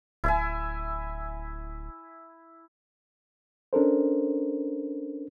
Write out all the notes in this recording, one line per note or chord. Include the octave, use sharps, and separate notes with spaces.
D1 E4 E5 G#5
C#4 D4 A4 A#4 C5